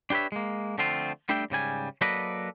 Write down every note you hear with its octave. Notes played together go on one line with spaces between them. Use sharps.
D4 G4 B4 C#5 E5
G#3 A#3
D3 F3 A3 C4 F4
G3 A3 D4 G4 E5 G5
G#2 C#3 G3 G#5
F#3 A#3 A4 B4 D5 D#5